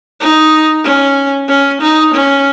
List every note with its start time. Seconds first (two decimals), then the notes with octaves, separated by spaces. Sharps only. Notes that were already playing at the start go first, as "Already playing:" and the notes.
0.20 D#4
0.84 C#4
1.48 C#4
1.80 D#4
2.14 C#4